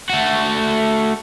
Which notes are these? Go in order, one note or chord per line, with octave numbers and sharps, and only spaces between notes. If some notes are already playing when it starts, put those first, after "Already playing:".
A3 F#4